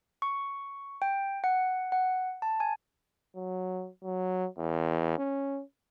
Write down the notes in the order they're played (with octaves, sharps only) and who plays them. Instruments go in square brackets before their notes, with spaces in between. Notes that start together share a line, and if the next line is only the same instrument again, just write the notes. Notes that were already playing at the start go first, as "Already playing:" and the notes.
[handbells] C#6
G5
F#5
F#5
A5
G#5
[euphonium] F#3
F#3
E2
C#4